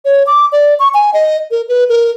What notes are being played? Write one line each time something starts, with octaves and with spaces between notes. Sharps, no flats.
C#5
D6
D5
C#6
G#5
D#5
A#4
B4
A#4